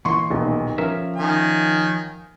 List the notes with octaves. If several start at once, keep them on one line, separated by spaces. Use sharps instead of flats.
A#2 E3 A#3 C6 C#6
D#1 B1
F3 C#4 A#4 E5
D#3 G#5